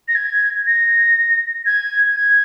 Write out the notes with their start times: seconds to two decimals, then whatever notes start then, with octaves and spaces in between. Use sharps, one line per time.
0.08 A#6
0.15 G#6
0.66 A#6
1.66 G#6
2.16 G#6